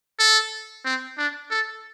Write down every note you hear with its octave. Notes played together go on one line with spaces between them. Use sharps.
A4
C4
D4
A4